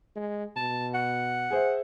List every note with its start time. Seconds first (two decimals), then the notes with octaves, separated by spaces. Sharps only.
0.16 G#3
0.56 B2 A5
0.94 F#5
1.50 G#4 C5 E5